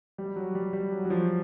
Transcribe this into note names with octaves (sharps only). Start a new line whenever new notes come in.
G3
F#3
G3
G3
F#3
F#3
F3